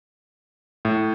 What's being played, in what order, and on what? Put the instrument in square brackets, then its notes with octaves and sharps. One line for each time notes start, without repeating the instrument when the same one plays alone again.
[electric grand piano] A2